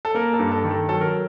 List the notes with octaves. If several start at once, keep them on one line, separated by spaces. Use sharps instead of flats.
A4
A#3 A#4
A4
G2
A4
D#3
A4
F#3 A4
A#4